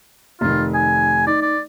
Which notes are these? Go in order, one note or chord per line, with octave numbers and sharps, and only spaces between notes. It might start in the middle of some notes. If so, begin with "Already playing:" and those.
F1 D#3 F4
G#5
D#4 D5
D5